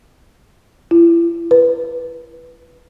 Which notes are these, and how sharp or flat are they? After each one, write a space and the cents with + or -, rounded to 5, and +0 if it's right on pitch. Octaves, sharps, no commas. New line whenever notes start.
E4 +35
B4 +0